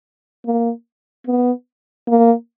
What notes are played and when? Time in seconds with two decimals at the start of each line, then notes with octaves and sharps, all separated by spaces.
0.46 A#3
1.27 B3
2.08 A#3